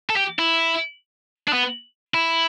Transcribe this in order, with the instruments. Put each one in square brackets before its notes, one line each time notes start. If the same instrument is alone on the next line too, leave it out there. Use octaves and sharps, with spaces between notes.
[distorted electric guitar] A4
G4
E4
D4
B3
E4